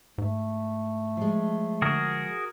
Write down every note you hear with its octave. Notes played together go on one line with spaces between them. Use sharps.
G#2 A3
F3 G#3
D3 F#4 G#4 A#4